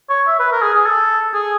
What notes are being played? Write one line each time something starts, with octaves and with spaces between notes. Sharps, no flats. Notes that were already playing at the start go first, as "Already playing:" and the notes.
C#5
E5
B4
A#4
G#4
G#4
A4
G#4